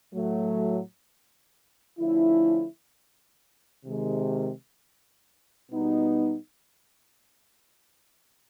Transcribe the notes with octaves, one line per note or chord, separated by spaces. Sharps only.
A2 F#3 A3
D3 F3 A3 C#4 E4
C3 D#3 G#3
B2 G3 B3 D#4